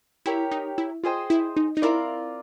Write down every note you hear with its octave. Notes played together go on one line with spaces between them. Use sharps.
E4 G4 A#4 C#5
D#4
E4
F4 G#4 C5 D#5 G5
E4
D#4
D#4
C4 E4 F4 A#4 D5